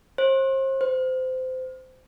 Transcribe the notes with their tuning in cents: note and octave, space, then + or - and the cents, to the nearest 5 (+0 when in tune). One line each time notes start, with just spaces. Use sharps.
C5 +35
C5 -25